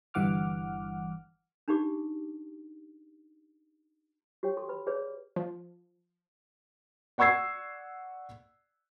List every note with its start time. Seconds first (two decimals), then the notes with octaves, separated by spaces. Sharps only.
0.14 G1 G2 E3 F#5 D6 F6
1.68 D4 D#4 F#4 G4 D6
4.43 F#4 G4 C#5 G5
4.57 A4 C6 C#6
4.69 B4 B5
4.87 G#4 B4 C#5 D5
5.36 F3
7.18 D5 F#5 C#6 E6 G#6 C7